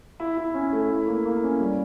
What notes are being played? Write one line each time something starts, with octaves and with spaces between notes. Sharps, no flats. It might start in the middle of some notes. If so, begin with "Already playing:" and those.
E4
E4
C#4
A3
E4
A#3
A#3
C#4
G3